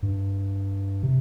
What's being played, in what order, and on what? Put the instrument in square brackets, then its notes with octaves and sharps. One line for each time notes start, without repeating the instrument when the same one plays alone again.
[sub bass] G2
C3